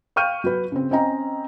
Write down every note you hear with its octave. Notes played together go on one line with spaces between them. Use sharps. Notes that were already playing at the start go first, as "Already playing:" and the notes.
F5 G5 C#6 F6 G6 D#7
F#3 B4
C#3 C4
C4 C#4 D#5 G5 A#5